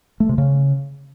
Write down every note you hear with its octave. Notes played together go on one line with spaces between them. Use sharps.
A3
C3
C#3